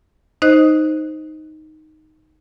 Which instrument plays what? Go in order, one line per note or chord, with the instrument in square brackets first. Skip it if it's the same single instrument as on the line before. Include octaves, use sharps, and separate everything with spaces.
[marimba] D#4 C5 D#5 F#6